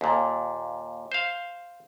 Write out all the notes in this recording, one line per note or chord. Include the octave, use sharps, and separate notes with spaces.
D#2 A#2
C5 F5